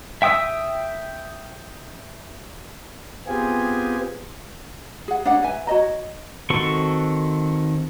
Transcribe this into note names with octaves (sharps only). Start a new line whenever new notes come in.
E5 G5 D#6 E6
B3 C4 F4 G4 G#4 G#5
G#4 F#5
D4 C#5 F#5
B4 E5 G#5
F#4 C#5 D#5 A#5
D#3 C4 F#4 A4 C#6